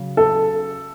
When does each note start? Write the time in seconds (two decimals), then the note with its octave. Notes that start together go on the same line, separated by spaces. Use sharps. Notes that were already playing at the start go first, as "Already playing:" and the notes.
Already playing: C#3 F#3
0.17 A4